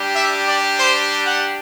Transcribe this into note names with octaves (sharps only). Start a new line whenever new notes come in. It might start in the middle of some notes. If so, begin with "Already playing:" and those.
Already playing: G3 D4 G4
E5
D5
C5
F#5